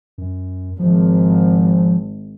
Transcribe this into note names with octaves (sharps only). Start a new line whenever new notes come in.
F#2
G#1 F3